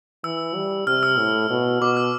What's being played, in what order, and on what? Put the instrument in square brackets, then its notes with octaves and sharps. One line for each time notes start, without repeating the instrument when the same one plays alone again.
[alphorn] E3 [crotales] E6
[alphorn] G3
[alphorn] C3 [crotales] F6
[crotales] E6
[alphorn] A2
B2
[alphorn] B2 [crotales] D6
[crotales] F6